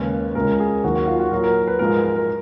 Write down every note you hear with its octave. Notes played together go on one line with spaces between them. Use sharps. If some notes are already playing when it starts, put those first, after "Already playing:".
Already playing: D#2 C#3 G#3 B4
C#2 C#3 G#3 A#4
G#4
D#2 D#3 F#3 F#4
F#4
F4
F#4
A#2 F#3 A#4
A#4
B4
G#2 F3 G#3 A#4
A#4
A#4